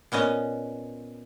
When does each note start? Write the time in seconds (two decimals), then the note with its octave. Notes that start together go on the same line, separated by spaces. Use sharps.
0.12 A#2 B3 C#4 D#5